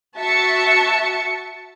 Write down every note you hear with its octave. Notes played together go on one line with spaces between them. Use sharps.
F#4 E5 A5 C#7